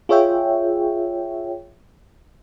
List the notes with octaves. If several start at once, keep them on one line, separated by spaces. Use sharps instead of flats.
F4 G#4 C#5 E5 G5